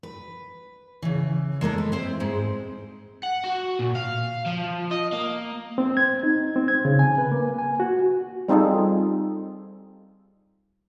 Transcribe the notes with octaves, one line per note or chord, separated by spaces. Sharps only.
B4
C#3 E3
G#3 A#3 A4 A#4
B4
C4 E4 C5
G#2 G#3 C4
F#5
F#4
A#2
F5
F3
D#5
A#3
C4
G#6
D#4
C4
G#6
C#3
G#5
B4
A#3
G#5
F#4
G3 C4 D#4 F4 G#4 A4